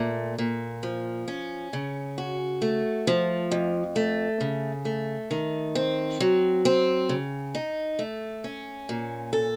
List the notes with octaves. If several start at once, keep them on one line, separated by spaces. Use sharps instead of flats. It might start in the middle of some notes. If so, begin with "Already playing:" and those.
Already playing: A#2 A3
A#2
F3
C#4
C#3
F#4
A3
F3
F2
A3
C#3
A3
D#3
C4
F#3
C4
C#3
D#4
A3
C#4
A#2
A4